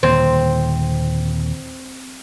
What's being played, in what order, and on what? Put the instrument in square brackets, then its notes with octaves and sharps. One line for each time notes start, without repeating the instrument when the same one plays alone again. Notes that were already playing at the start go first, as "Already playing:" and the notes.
[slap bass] D#2 A#2 D3 [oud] C4